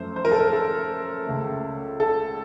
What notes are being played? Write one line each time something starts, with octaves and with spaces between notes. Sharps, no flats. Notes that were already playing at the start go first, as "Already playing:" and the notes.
Already playing: F#2 F3 A3 C5
C5
A#4
A4
A#4
A4
C#2 C#3 A3
A4